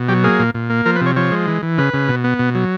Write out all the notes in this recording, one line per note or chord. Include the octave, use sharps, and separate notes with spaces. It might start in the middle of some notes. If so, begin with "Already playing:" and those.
Already playing: B2
F#3 G4
A#3 G#4
A#2
A#2
A#3
F3 A#4
B4
C3 C#5
F3 C#5
G#3
E3
E3
C#3 B4
C#3
B2
B3
B2
F#3